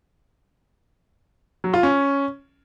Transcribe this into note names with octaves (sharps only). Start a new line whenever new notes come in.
F#3
F4
C#4